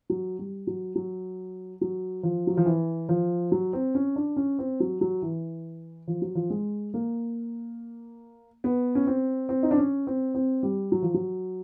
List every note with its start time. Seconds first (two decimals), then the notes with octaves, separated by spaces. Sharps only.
0.10 F#3
0.39 G3
0.67 F#3
0.95 F#3
1.81 F#3
2.23 F3
2.47 F#3
2.57 F3
2.66 E3
3.09 F3
3.52 F#3
3.73 C4
3.95 C#4
4.16 D4
4.36 C#4
4.59 C4
4.80 F#3
5.01 F#3
5.22 E3
6.08 F3
6.22 F#3
6.35 F3
6.50 G#3
6.94 A#3
8.64 B3
8.95 C#4
9.07 C4
9.49 C4
9.63 D#4
9.71 D4
9.78 C#4
10.07 C4
10.35 C4
10.63 G3
10.92 F#3
11.02 F3
11.14 F#3